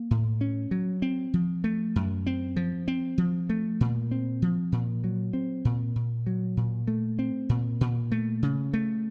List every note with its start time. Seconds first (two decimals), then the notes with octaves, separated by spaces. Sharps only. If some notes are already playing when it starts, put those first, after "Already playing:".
Already playing: A#3
0.11 A2
0.41 C#4
0.71 F#3
1.02 C4
1.34 F3
1.64 A3
1.96 F#2
2.27 C4
2.56 F3
2.88 C4
3.18 F3
3.50 A3
3.81 A#2
4.11 C4
4.42 F3
4.72 A#2
5.04 F#3
5.33 C4
5.65 A#2
5.96 A#2
6.27 F#3
6.57 A#2
6.88 A3
7.19 C4
7.49 A#2
7.81 A#2
8.12 A3
8.43 C#3
8.74 A3